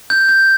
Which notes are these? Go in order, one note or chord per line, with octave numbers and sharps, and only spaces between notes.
G6
G6